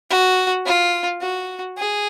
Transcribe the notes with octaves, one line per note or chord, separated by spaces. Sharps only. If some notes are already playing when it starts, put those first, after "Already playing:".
F#4
F4
F#4
G#4